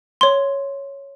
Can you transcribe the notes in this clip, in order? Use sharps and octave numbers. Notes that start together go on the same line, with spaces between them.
C#5 C6